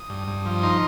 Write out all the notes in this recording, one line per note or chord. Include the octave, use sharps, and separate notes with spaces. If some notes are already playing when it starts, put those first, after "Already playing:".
Already playing: D#6
G2
G2
F3
D#4 C6